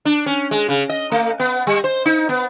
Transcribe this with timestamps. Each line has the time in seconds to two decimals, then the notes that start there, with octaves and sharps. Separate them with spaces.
0.05 D4
0.26 C#4
0.51 G#3
0.69 C#3
0.89 D#5
1.12 A3
1.40 B3
1.67 G3
1.84 C5
2.05 D#4
2.29 B3